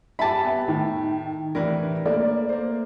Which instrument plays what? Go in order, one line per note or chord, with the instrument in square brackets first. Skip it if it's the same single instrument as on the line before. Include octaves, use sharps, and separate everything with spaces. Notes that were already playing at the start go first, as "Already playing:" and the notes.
[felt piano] G2 G#5 D6 [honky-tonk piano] G4 E5 [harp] A5 B5
[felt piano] B3
[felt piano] A2 [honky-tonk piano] D#3
[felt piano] A2 C3 E3 [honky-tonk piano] D4 [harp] A#4 B4
[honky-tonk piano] A3 D5 [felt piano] A#3
[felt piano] A#3 C5